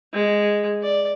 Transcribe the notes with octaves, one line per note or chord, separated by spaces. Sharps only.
G#3
D5